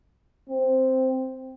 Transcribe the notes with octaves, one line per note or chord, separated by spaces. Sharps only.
C4